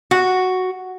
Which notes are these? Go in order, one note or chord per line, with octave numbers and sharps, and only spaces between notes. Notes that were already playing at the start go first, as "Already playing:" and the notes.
F#4